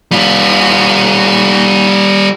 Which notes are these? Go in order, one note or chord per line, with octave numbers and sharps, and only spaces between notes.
G3 F4